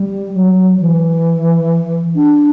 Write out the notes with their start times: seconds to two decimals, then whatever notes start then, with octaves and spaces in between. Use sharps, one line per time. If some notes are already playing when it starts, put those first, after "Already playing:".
Already playing: G3
0.34 F#3
0.80 E3
2.15 D4